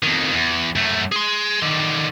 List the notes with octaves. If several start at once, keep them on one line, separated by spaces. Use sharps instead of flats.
F2 D#3
E2
F#2 A3
G#4 C6
D3 D#3